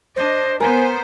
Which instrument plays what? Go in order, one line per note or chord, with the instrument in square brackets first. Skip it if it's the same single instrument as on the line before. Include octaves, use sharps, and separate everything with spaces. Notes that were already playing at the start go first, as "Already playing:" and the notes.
[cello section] D4 D#5 [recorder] C5
[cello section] B3 C5 [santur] A#4 [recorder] G#5